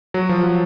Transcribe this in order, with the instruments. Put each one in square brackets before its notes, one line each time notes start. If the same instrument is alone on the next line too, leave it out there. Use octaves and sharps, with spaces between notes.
[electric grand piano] F#3
F3
F#3